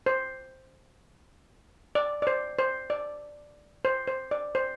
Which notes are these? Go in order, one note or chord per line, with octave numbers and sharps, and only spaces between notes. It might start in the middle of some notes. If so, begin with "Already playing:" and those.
C5
D5
D5
C5
C5
D5
C5
C5
D5
C5